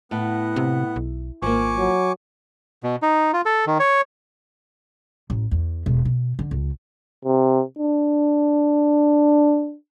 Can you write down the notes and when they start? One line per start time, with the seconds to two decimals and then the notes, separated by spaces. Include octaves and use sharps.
0.11 A2 B3 F#5
0.56 C3
0.96 B1
1.42 G#1 F3 A#3 G#5 C#6 D6
1.78 F#3
2.83 B2
3.02 D#4
3.33 F4
3.45 A4
3.67 D#3
3.80 C#5
5.30 A1
5.51 E2
5.86 E1
6.05 B2
6.39 D3
6.51 C#2
7.25 C3
7.78 D4